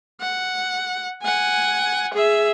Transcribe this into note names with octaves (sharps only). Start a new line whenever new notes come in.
F#5
F#5 G#5
G#4 E5